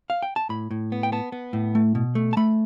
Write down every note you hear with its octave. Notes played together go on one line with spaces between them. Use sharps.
F5
G5
A5
A2 B5
A2
B3
G5
B3 A5
B3
A2
A3
B2
A3
A5
A3 B5